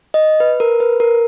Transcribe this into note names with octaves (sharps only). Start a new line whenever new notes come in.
D#5
B4
A#4
B4
A#4